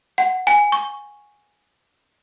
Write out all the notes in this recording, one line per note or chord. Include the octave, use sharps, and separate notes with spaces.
F#5
G#5
C#6